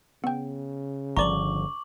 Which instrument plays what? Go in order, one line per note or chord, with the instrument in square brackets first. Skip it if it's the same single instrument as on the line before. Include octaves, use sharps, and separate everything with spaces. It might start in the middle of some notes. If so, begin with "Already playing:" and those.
[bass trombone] C#3 [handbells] B3 G5
[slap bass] G1 D3 F3 [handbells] D5 A#5 [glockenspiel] C#6 D6 F#7